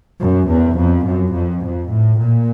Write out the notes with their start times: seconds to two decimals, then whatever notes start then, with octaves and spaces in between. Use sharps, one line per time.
0.21 F#2
0.49 E2
0.78 F2
1.06 F#2
1.34 F2
1.64 F2
1.91 A2
2.20 A#2